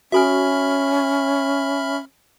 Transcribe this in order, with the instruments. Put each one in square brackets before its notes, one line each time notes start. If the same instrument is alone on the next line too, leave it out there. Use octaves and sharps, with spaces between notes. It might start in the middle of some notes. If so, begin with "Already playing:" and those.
[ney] C#4 [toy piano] F#4 A4 G#5 [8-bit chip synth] E5 B5 F6